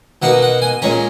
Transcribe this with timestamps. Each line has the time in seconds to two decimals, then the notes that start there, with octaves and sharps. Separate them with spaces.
0.22 B2 A#3 D#4 F#5
0.42 F#5
0.62 G#5
0.82 A#2 G#3 C#4 A#5